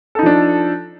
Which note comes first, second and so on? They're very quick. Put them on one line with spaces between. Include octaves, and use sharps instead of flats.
A4 D#4 F3 D4